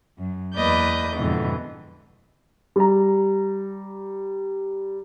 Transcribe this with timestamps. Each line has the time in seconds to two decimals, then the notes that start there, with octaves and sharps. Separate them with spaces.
0.18 F#2
0.56 E2 A#3 B4 D5 D#5 G6
1.15 F2 G#2 B2 D3 E3
2.76 G3 A#5